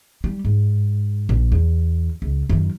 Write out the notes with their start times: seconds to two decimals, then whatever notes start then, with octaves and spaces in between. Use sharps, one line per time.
0.24 G3
0.45 G#2
1.29 A#1
1.52 E2
2.22 C#2
2.49 F#2 D#3